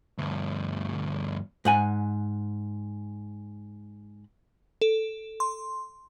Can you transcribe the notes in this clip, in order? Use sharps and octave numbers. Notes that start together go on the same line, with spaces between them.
D2 G2
G#2 F#5 G#5
A4
C6